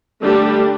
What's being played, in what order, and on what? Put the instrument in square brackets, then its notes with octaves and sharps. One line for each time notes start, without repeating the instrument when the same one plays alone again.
[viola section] D3 G3 A3 D4 G4